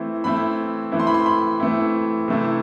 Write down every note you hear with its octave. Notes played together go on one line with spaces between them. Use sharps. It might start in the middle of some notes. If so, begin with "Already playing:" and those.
Already playing: E3 A3 C4 E4
E3 A3 C4 E4 B5
E3 A3 C4 E4
C6
B5
C6
B5
E3 A3 C4 E4
C3 E3 A3 C4 E4